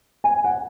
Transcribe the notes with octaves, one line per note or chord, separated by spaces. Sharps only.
G#5
F#5